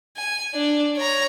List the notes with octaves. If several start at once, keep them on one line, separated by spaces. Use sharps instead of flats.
G#5
D4
C#5 A#5